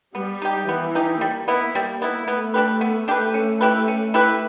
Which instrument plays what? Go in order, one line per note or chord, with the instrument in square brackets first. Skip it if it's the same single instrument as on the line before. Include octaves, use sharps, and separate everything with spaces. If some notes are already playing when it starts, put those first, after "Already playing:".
[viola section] G3 [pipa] B3
[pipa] D#4 G4
[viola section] E3 [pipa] B3
[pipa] D#4 G4
[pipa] G3 [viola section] A#3
[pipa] B3 E4
G3
B3 E4
[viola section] A3 [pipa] B3
[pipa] D4 G4 B4
B3
D4 G4 B4
C#4
E4 G4 B4
C#4
E4 G4 B4